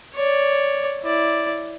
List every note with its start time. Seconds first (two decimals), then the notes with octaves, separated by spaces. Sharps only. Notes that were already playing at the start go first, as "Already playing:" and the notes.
0.14 C#5 D5
1.03 E4 D5